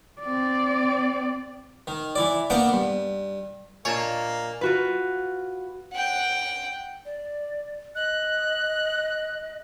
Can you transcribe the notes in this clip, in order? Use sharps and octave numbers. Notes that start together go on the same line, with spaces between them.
C4 D5
D#3
E3 E4 D5
A#3 B3 D4 F#5 G5
G2
A#2 A#3 D4 C#5 D#5 G#5 A6 E7
F4 F#4 B4
F#5 G5
D5
D#5 F#6